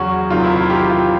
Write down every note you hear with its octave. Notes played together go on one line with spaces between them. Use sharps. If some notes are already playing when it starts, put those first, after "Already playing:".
Already playing: E2 C#3 F#3 C#4 F#4
E2 C3 D#3 F#3 F4
E4
F4
G4
F4